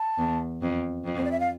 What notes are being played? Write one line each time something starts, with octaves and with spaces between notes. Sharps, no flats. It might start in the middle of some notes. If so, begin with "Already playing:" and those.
Already playing: A5
E2
F2
F2
C5
D5
E5
F5